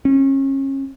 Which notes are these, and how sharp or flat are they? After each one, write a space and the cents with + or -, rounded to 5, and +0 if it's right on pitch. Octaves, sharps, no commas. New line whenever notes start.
C#4 -30